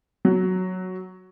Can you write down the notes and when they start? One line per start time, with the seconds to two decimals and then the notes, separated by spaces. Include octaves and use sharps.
0.25 F#3